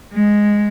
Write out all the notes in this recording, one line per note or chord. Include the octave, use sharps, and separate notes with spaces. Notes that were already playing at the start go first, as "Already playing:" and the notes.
G#3